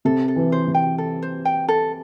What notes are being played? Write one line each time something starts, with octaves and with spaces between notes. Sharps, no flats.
C3 A4
A4
E3
C5
C3
G5
A4
C5
G5
A4